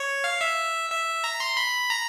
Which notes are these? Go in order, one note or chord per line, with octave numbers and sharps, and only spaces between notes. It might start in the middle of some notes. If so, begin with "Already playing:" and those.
Already playing: C#5
F5
E5
E5
A#5
C6
B5
A#5